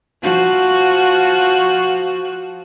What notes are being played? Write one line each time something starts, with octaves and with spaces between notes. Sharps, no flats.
F3 F#4